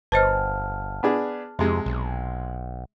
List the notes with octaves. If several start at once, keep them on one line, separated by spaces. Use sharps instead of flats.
G1 B4 C5 D#5 A5 F6
B3 D4 G#4
F2 C3 G#3
B1